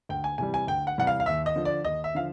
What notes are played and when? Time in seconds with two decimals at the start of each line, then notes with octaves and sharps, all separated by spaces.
0.09 D2 G5
0.24 G#5
0.38 C3 E3 G3 G#5
0.54 G#5
0.67 D2 G5
0.87 F#5
0.98 C3 E3 G3 F#5
1.07 F5
1.20 F5
1.26 D#2 E5
1.46 D#5
1.56 D3 F3
1.65 D5
1.85 D#2 D#5
2.04 E5
2.15 D3 F3 F5